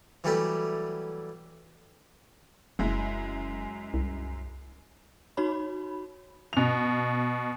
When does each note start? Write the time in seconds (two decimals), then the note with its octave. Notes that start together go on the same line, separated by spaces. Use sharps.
0.24 E3 F#3 G3 A3 G4 D5
2.79 F1 F#2 G#3 E4
3.94 C2
5.37 D#4 F#4 C#5 B5
6.53 B2 F7